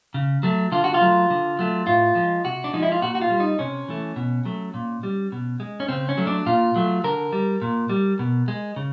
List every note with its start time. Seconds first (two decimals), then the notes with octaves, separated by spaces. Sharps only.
0.14 C#3
0.43 F#3 A3
0.72 D3 F4
0.84 F#4
0.94 F4
1.01 F#3 A3
1.30 D3
1.59 F#3 A3
1.87 A2 F4
2.15 F3 G#3
2.45 C3 F#4
2.64 D4
2.73 F3 G#3 D#4
2.83 E4
2.92 F4
3.02 A#2 F#4
3.15 F#4
3.21 F4
3.30 G3
3.40 D#4
3.59 C3 C#4
3.89 E3 A3
4.16 B2
4.45 F#3 A3
4.74 A#2
5.03 G3
5.32 B2
5.60 G#3
5.80 C#4
5.88 C#3 C4
6.09 C#4
6.17 F#3 A3
6.27 D4
6.46 A#2 F4
6.76 F#3 A3
7.04 D3 A#4
7.32 G3
7.62 A#2
7.89 G3
8.19 B2
8.48 G#3
8.76 C#3